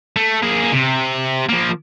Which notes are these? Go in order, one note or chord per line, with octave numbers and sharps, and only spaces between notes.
A3
A#3 G#4
C3
F3 A#3